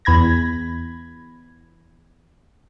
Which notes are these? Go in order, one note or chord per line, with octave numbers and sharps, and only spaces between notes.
E2 B5 G#6 A#6